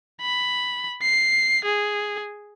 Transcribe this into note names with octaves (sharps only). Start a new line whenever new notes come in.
B5
C7
G#4